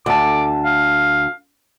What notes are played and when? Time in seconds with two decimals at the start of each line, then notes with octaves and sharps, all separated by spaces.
0.06 D2 A5 D6
0.65 F5